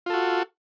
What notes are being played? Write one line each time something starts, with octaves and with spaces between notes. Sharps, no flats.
F4 F#4 A4